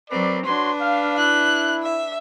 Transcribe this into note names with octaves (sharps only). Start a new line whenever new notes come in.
F#3 C4 A#4 B4 D5
D4 F#4 B4 C#5 C6
F5
E4 F#6
E5